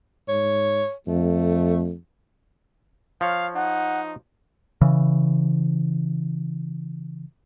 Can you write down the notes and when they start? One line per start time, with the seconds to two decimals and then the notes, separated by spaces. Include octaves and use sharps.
0.29 G#2 C#5
1.08 F2 A3
3.21 F3 C#5 F5
3.55 D#4 F#5
4.81 C#3 E3